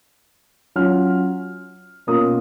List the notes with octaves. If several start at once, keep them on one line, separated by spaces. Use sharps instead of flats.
F#3 C#4 F4 F6
B2 A#3 C#4 F4 D#6